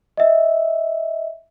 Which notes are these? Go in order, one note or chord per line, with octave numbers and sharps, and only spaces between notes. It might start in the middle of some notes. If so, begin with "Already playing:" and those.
D#5 E5